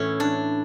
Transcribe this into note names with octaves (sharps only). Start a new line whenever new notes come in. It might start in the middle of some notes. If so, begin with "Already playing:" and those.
Already playing: A2 E3 C#4 E4
D4